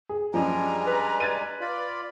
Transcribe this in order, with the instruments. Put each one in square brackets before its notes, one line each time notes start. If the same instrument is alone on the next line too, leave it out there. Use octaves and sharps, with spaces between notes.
[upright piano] G#4
[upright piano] F#2 F3 [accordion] G3 G#3 D4 [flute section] G#5 A#5
[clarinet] B4
[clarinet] B4 [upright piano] G#6 A6 D#7
[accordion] F4 D5 B5